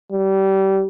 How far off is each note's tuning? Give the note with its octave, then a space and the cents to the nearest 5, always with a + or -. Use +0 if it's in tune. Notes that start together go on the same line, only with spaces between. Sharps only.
G3 -25